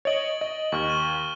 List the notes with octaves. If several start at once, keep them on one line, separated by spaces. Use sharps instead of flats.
C#5 D#5 A6 D7 F#7
D#5
D#2 C#6 F6
D#7 G7